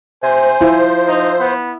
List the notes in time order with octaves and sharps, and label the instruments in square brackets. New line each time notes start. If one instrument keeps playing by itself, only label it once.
[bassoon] C3 [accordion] C5 [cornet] G#5
[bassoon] F3 [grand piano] E4
[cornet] D#4
B3